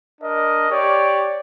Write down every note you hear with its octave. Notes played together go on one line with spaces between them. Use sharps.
D4 A#4 D#5
G4 C#5 D5